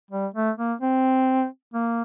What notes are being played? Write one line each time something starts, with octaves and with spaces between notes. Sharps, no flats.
G3
A3
A#3
C4
A#3